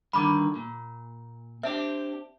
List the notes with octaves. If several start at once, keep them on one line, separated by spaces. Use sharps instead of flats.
G2 D3 D#3 B5 D6
A#2
C4 D4 G4 E5